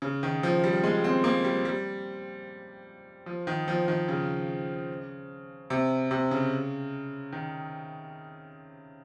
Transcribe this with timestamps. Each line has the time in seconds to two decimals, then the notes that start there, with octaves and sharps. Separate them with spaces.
0.02 C#3
0.23 D#3
0.43 F3
0.64 G3
0.84 G#3
1.04 C4
1.24 A#3
1.44 G3
1.65 G3
3.26 F3
3.47 D#3
3.68 F3
3.88 D#3
4.08 C#3
5.70 C3
6.11 C3
6.31 C#3
7.32 D#3